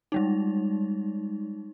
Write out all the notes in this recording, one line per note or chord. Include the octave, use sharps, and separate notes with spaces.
G3 G#3 D#4